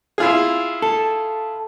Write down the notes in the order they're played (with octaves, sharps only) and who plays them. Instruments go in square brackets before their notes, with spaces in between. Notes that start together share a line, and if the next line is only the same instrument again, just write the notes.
[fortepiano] E4 F4 G#4
[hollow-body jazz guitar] A4